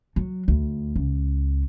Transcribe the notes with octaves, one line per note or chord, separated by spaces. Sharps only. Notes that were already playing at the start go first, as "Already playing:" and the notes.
F#3
D2
C#2